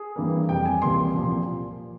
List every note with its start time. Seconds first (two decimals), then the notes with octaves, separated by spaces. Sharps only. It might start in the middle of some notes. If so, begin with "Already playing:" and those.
Already playing: G#4
0.16 G2 E3 G3 A#3
0.49 F2 C3 G3 G5
0.66 G#5
0.82 C#2 C3 E3 G3 A#3 C6
1.15 C2 A#2 F3 A#3